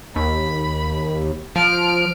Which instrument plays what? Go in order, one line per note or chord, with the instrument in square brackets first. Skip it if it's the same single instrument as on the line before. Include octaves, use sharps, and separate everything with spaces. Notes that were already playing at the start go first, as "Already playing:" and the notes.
[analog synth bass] D#2 [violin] B5
[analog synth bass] F3 [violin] F6 D7